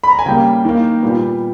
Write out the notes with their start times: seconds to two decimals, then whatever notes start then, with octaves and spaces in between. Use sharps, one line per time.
0.04 B5
0.11 A#5
0.19 G#5
0.26 C#3 G3 A#3 G5
0.65 D#3 A#3
1.03 A#2 G3 B3